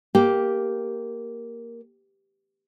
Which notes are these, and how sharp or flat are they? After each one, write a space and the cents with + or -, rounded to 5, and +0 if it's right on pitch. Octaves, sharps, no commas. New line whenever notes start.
A#3 +0 G4 +0